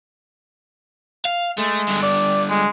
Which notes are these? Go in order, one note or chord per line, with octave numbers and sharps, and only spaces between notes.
F5
G#3 A3
G2 D3
D5
G#3